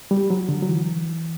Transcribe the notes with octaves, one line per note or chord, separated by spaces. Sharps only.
G3
F#3
D3
F#3
E3